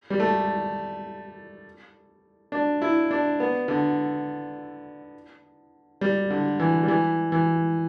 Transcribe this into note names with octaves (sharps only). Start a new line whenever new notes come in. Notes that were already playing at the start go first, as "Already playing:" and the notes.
G3
A3
D4
E4
D4
B3
D3
G3
D3
E3
G3
E3
E3